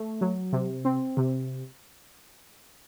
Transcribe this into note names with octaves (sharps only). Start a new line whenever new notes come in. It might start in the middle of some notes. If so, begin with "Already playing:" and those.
Already playing: A3
F#3
C3
C4
C3